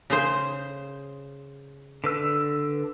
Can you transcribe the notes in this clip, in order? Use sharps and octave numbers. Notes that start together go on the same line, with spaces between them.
C#3 G#4 C5
D3 B4 E6